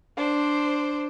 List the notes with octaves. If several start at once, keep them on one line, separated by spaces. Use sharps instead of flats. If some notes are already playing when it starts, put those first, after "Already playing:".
D4 C5